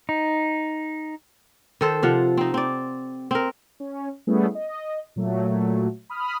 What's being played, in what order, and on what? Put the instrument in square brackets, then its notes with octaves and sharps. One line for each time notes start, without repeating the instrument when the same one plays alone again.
[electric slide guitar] D#4
[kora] D#3 A4 C5
C3 F3 F5 F#5
C4 D#4
C4 D5
C4 A#4
[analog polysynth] C#4
G3 A3 B3 C#4 E4 G#4
D#5
A#2 F#3 A3
B5 D#6 F6